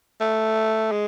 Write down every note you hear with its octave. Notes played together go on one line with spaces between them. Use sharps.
A3
G#3